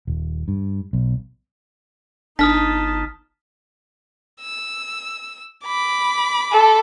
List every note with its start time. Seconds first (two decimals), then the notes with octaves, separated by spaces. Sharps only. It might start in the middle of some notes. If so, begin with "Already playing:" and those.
0.07 D#1
0.48 G2
0.93 B1
2.39 G1 D4 D#4 A5 D#6 F6 B6
4.41 E6
5.65 B5 D6
6.52 A4